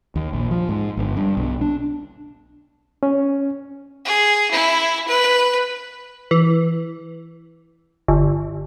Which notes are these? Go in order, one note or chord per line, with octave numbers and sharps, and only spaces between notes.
D#2
A#1
F3
G#2
G1
G2
B1
D4
C#4
G#4
E4
B4
E3
G1